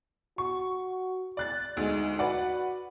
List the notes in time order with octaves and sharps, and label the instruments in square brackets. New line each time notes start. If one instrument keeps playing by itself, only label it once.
[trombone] F#4 [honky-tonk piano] C#6
[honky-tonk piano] D5 F#6 A6
[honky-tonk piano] D2 G#3 [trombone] D#4
[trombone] F#4 [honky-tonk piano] B4 D5 F#5